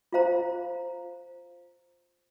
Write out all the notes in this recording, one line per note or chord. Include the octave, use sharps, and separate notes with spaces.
F4 C5 F5 A#5